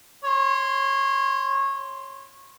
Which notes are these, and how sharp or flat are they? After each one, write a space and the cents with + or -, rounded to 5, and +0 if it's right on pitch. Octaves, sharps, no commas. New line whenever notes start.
C#5 -20 C6 +0